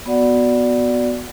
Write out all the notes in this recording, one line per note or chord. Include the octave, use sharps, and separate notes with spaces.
B3 F#4 D5 F#5